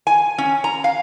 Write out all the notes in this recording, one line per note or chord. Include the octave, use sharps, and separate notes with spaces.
G#5
C#4
A#5
F5